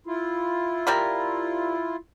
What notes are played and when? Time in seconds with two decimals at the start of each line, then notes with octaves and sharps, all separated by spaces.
0.07 E4 F4
0.87 G3 A#4 B5